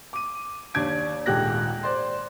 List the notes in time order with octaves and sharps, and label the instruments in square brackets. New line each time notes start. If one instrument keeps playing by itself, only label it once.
[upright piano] D6 D#7
D#2 D4 G#6 D7
D#1 G#2 G4 A4 F#6 A#6
C5 D5 C6